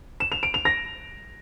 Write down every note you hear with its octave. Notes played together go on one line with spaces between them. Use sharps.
E7
F7
D7
F7
A#6